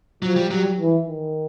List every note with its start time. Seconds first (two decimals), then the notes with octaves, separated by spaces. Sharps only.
0.22 F3 F#3
0.36 G3
0.51 F#3 G3
0.79 E3
1.07 D#3